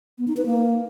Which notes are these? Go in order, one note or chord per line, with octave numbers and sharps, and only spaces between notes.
B3
D#4
B4
A#3